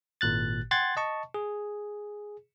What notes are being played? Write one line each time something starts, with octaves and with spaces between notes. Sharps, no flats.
G#1 A#2 F#6 A6
F#5 G5 C6 F#6 G#6 A6
D#5 A5 C#6
G#4